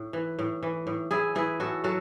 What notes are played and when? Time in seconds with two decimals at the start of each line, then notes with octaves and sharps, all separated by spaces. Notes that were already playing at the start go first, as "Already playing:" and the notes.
Already playing: A2
0.13 E3
0.39 A2
0.63 E3
0.87 A2
1.11 A2 E4 G#4
1.35 E3 E4 G#4
1.60 A2 F#4 A4
1.84 F#3 F#4 A4